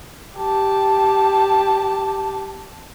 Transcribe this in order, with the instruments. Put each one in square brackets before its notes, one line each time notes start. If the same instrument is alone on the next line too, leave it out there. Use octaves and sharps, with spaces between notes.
[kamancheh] G4 A5